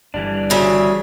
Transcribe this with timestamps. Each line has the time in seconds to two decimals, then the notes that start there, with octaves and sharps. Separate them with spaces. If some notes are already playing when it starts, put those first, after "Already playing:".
0.14 G1 E3 G3 D4
0.50 D2 C#3 E5